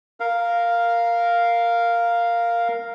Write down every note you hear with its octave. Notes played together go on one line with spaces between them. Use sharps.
A#4 F5